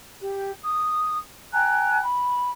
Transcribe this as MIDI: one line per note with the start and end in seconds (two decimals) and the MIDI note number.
0.21 0.51 67
0.61 1.17 87
1.52 2.00 79
1.52 2.00 80
1.52 2.00 82
1.52 2.00 90
2.01 2.50 83